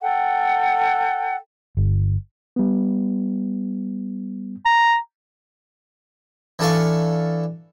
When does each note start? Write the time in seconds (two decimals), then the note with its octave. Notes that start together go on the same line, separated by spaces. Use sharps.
0.01 A4 F#5 G5
1.77 G1
2.56 G3 B3
4.66 A#5
6.59 E3 D4 A4 F5 C#6